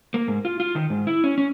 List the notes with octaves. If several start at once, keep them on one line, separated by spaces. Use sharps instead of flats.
A#3
G#2
F4
F4
D#3
G#2
E4
C#4
C#4